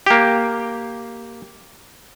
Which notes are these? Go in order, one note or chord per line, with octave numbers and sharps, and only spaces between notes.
A#3 G4